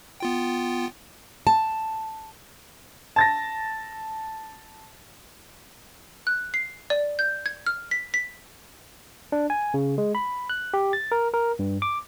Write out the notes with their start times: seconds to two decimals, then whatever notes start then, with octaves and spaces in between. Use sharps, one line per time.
0.20 B3 F4 G5
1.47 A5
3.16 A5 A6 A#6
6.27 F#6
6.54 C7
6.90 D5
7.19 G6
7.46 G#6
7.66 F6
7.91 B6
8.14 B6
9.32 D4
9.50 G#5
9.74 C#3
9.98 G#3
10.15 B5
10.50 F#6
10.74 G4
10.93 A6
11.12 A#4
11.34 A#4
11.59 G2
11.82 D6